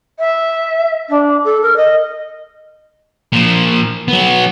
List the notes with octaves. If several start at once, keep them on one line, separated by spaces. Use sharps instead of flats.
E5
D4
A4
A#4
D#5
A#2 F3
F#3 B3